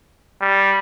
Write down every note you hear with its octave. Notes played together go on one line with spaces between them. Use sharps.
G3